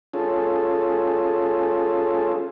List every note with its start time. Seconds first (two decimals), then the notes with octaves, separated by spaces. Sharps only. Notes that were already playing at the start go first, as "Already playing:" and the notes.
0.14 C#4 F4 G#4 A4